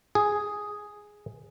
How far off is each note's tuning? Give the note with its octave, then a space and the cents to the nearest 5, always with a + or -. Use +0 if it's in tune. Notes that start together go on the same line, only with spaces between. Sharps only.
G#4 +0